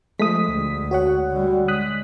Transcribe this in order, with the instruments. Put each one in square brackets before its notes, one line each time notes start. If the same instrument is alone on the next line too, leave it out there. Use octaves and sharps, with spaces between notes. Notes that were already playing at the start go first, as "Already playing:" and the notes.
[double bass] F3 [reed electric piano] G#3 A3 D#6 [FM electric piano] B6
[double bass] D2
[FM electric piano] F#4 C#5 F#5
[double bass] D3 G3
[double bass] G#3 [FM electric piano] D#6 F#6 B6